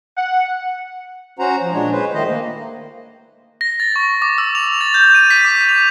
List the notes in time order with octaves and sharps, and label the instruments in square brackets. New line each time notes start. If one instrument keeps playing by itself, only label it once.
[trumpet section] F#5
[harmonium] C#4 F#4 C5 F#5 A#5
F3
A#2 G#3 D4 C#5
G#3 B4 C5
D#3 A3 C5 D#5
A#3
[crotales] A#6
A6
C#6
D6
E6
F7
A6
G6
D#7
B6
D6
F7